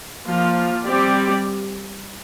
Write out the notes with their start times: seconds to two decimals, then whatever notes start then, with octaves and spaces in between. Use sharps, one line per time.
0.25 F3 A#3 F4
0.85 G3 C4 G4 D5